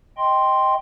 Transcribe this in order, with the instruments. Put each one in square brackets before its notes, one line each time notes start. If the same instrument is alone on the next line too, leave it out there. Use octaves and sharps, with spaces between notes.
[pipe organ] D#5 G5 C6